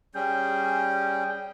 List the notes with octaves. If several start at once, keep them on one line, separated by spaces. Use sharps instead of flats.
G3 C#4 G#4 G5